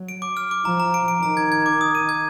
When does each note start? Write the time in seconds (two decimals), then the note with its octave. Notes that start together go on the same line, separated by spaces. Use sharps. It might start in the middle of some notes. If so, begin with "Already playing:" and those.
Already playing: F#3
0.09 D7
0.22 D6
0.37 F6
0.51 D6
0.65 F3 A#5
0.80 A#5
0.94 D7
1.08 D7
1.23 D#3 A#5
1.37 G#6
1.52 G#6
1.66 D6
1.81 D#6
1.95 D#7
2.09 G#6